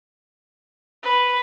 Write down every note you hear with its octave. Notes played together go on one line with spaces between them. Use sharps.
B4